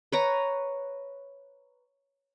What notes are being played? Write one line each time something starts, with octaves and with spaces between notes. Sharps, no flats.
B4 C#5 A#5